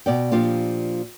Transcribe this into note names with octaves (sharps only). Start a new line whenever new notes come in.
B2 D5 G5
A#2 F3 D4 F4 G4